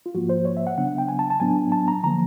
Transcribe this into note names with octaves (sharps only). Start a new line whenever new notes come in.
F4
G#2 F3 A#3 F#4
C5
C#5
E5
F#5
C#3 F#3 B3 D4 F#5
F#5
G5
G#5
A5
A5
A2 F#3 B3 D4 G#5
A5
A#5
D3 F3 A#3 A#5